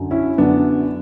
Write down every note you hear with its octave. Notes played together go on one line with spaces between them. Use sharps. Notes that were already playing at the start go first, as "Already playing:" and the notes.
Already playing: F#2 D3 F#3
C#4 E4
F#2 D3 F#3 B3 D4